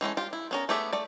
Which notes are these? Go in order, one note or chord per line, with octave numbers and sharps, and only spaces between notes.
E3 G#3 A3 C#4
F4 G4
E4
B3 C#4 A#4
A3 B3 G4 G#4 E5
A3 D5